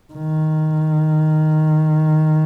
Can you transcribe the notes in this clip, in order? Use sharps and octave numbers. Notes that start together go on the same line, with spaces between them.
D#3